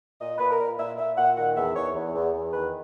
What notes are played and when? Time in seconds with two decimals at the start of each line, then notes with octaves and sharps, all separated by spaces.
0.20 A#2 D#5
0.38 A#2 B4
0.50 A#4
0.59 A#2
0.78 A#2 E5
0.98 A#2 E5
1.17 A#2 F#5
1.37 D#3 F#5
1.56 E2 E5
1.75 E2 C#5
1.95 E2
2.15 E2
2.33 E2
2.53 D#3 B4